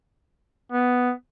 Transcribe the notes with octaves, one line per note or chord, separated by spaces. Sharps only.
B3